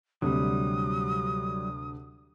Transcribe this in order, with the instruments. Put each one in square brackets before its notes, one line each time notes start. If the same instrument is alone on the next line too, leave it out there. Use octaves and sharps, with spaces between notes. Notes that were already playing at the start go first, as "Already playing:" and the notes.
[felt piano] D2 C3 [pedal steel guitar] F#3 G3 [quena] D#6